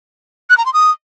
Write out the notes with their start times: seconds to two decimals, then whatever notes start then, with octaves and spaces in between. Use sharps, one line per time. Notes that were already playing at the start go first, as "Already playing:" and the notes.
0.50 F#6
0.58 A#5
0.66 C6
0.73 D#6